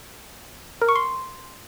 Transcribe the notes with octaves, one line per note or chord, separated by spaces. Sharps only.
A#4
C#6
C6